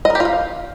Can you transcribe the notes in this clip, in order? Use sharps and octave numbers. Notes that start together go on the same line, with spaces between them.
D#5
A#4
G4
F4
F5